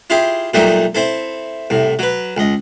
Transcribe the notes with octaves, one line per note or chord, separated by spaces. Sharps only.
E4 F4 G4 G#4
A#2 F#3 G3 A3 D#4 G4
C4 E4 A4
C2 A2
F#3 B4
C#2 D#5